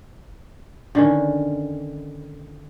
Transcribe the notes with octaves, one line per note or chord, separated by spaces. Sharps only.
D3 D#3 C#4